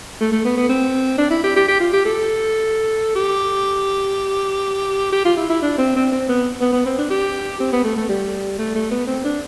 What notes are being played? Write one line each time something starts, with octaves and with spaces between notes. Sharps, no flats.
A3
A3
B3
B3
C4
D4
E4
G4
G4
G4
F4
G4
A4
G4
G4
F4
E4
E4
D4
C4
C4
C4
B3
B3
B3
C4
D4
G4
C4
B3
A3
A3
G3
A3
A3
B3
C4
D4